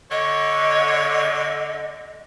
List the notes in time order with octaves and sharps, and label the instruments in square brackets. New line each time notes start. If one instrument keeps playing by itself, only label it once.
[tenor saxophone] D3 [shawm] C#5 [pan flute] D#5